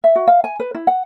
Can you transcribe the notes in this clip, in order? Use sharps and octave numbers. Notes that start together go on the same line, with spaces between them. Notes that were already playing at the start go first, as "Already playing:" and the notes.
E5
F#4
F5
G#5
B4
E4
F#5